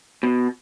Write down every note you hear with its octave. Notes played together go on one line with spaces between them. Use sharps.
B2